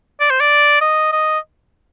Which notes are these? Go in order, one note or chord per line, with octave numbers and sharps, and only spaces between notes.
D5
C5
D5
D#5
D#5